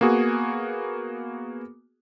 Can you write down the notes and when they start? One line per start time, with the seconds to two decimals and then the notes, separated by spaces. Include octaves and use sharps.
0.01 A#3 B3 F#4 G#4